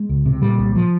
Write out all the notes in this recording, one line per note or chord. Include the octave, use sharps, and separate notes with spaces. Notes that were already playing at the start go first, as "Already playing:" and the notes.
Already playing: G#3
C#2
C3
A#2 G3
C2
F3